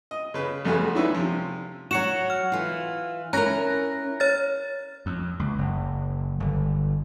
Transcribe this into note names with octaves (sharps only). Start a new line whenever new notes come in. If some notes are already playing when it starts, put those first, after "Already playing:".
D#5
C#3 B4
A1 F2 A3 F#4 G#4 B4
D#3 C#4 D4 E4 B4
C3 F3
F#3 F#4 C#7 E7
F6
E3 F4
C#4 E4 A#4 A#5 F#6 A#6
C#5 F6 A6
F2
C#2
F#1
G1